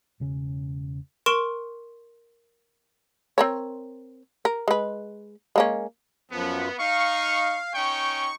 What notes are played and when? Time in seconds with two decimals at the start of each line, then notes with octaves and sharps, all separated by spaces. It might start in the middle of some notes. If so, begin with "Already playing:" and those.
0.20 E1 C#3 C#4
1.26 A#4 C6 C#6 D7 E7
3.38 C4 A#4 C#5
4.45 A#4
4.68 G#3 B4
5.56 G#3 A#3 C#4
6.32 F#2 F3 B3
6.79 D#4 F5 C#6
7.74 C#4 D#4 G5 C#6